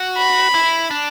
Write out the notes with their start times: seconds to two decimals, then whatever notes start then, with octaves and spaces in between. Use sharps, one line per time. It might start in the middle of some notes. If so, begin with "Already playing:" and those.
Already playing: F#4
0.18 B5
0.55 E4
0.91 D4